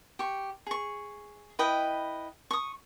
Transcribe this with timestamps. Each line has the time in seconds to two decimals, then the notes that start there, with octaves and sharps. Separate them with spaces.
0.19 G4 C#6
0.67 G#4 C#6
1.59 E4 B4 D#5 G5
2.51 C#6 D#6